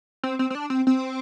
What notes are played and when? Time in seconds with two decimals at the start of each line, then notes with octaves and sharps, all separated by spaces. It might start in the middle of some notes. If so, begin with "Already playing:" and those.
0.24 C4
0.39 C4
0.50 C4
0.55 D4
0.70 C4
0.87 C4